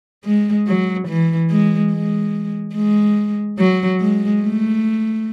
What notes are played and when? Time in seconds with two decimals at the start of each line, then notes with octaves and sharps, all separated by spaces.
0.25 G#3
0.67 F#3
1.08 E3
1.50 G#3
1.92 G#3
2.75 G#3
3.59 F#3
4.00 G#3
4.42 A3